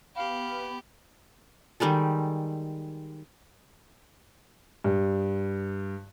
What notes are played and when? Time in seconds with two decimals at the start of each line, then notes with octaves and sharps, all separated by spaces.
0.16 B3 G4 F5 B5
1.80 D#3 G3 G#3 A4
4.84 G2